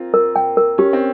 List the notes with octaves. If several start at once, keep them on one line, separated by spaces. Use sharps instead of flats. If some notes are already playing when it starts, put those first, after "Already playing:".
Already playing: A#3 C4 F4
A#4
G5
A#4
C#4 G4
C4